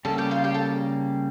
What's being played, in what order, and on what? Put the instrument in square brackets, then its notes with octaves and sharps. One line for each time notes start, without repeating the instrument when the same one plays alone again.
[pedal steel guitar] C#3 G3 A#3 [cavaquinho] A4 A5
[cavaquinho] G4 G5
F4 F5
G4 G5
A4 A5